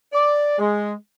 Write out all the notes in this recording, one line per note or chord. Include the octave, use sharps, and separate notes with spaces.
D5
G#3